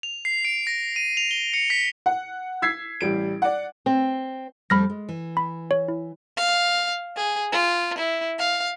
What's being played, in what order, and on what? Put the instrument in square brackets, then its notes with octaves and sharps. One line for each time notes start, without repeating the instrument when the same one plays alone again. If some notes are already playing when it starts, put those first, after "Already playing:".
[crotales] F7
C7
D7
A#6
D#7
F7
G7
C#7
B6
[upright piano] F#5
E6 G#6 B6 C7
A1 G3 D7
D5 F#5
[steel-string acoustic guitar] C4
[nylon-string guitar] F2 G3 A3 [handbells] B5 F6 A#6
[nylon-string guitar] G#3
E3
[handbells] B5
C#5
E4
[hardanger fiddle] F5
G#4
F4
E4
F5